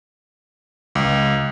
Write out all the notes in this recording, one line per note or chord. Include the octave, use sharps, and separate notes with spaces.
C#2